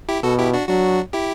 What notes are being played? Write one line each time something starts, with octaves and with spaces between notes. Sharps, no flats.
E4 G4
B2 F#4 A4
E4 G4
D4 F#4
F#3 D4 F#4
E4 G4